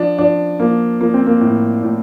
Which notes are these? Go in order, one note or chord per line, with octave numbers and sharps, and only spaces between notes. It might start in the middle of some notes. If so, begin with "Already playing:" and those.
Already playing: F3 D4
F3 D4
F3 A#3
F3 A#3
C4
A#3
A2
A2